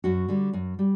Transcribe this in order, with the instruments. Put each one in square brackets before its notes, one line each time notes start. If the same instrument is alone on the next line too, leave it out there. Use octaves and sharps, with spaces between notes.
[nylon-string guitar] F#2 F#4
D3 G3
F#2
G3